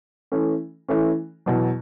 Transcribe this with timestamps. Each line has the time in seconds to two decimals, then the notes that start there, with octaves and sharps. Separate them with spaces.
0.32 E3 A3 C#4
0.88 E3 A3 C#4
1.46 E2 B2 F#3